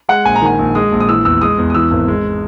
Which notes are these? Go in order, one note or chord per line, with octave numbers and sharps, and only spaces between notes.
G#3 F#5
A#1 G#5
A#5
D#3 G#5
A#1
G#3 D#6
A#1
D#6
E3 E6
E2 E6
G#3 D#6
E2
D#6
E3 E6
G#1
G#3